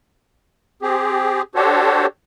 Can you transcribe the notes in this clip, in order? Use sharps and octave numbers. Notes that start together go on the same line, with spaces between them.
C4 G4 G#4
D4 F#4 G4 A4 C5 C#5